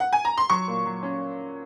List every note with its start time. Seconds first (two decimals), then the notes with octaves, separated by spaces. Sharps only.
0.00 F#5
0.13 G#5
0.25 A#5
0.38 C6
0.50 F#3 C#6
0.68 A#2
0.86 F#3
1.03 C#4